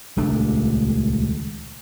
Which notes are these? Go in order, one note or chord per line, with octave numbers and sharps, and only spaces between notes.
D#1 C#2 A3 D4